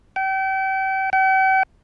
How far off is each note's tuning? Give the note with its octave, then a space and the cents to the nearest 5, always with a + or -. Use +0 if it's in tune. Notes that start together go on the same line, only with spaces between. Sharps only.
G5 -35
G5 -45